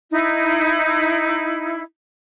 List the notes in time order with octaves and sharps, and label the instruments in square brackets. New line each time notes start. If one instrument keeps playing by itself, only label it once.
[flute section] D#4 E4